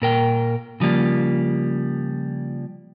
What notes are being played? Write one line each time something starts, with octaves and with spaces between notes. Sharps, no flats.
A#2 A#4 G5
C#3 F3 G3 A#3